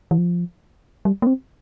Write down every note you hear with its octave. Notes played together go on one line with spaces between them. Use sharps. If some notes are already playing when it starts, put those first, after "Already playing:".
E3
F3
G3
A#3
C4